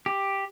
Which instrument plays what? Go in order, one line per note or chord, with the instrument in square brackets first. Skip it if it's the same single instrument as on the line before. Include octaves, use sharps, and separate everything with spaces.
[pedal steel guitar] G4